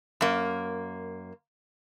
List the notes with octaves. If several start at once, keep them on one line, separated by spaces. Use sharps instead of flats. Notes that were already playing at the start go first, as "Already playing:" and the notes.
F#2 A#3